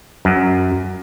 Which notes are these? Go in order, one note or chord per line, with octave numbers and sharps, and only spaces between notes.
F#2